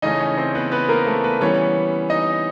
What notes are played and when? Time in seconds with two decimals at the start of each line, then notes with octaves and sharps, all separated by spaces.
0.02 C#3 E3 A3 C#4 D#4 D#5
0.20 C#4 C#5
0.38 C4 C5
0.55 B3 B4
0.71 B3 B4
0.89 A#3 A#4
1.06 A3 A4
1.24 B3 B4
1.41 E3 G3 B3 C#4 C#5
2.10 D#4 D#5